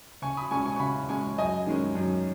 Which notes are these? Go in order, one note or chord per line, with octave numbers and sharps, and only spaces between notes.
C#3 G#5 C#6
B5 D#6
G#3 C#4 G#5 C#6
G#5 C#6
C#6
C#3 F#5 B5
G#3 C#4 G#5 C#6
F#2 D#5 G#5
D#3 G#3 C#4
F#2